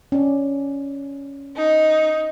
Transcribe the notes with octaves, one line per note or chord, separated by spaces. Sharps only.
C#4 D5
D#4